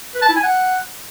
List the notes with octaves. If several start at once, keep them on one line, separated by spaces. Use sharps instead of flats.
B4
A5
E4
G#5
F#5